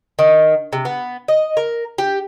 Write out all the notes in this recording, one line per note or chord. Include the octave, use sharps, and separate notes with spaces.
D#3
C3
B3
D#5
A#4
G4